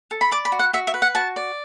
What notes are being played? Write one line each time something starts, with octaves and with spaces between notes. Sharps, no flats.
A4
B5
D5 D6
B5
F#4
F#5
F#4 E5
E5
B4
F#5
F#4 A5
D5